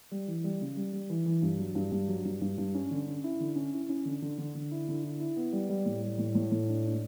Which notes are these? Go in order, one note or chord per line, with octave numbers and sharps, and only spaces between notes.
G3
E3
G3
C#3
G3
G3
E3
E3
G2
F#3
G2
G2
F#3
G2
G2
G2
C#4
D3
C#4
E4
D3
C#4
E4
C#4
D3
D3
D3
D3
E4
D3
E4
E4
B3
G3
G3
A2
G3
A2
A2
A2
D4
D4